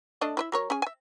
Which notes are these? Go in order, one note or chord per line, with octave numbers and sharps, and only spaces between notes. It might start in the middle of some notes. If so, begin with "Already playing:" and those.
A3 D4 D#5
E4 B4 E5
F#3 A#4 C#5
C#4 G#4 G#5
E5 G#5